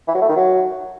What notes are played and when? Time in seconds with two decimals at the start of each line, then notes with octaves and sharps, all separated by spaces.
0.07 E3
0.15 F#3
0.22 A3
0.29 D#3
0.36 F#3